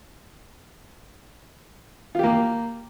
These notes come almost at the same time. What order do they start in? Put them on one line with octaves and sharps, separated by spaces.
F4 G4 A#3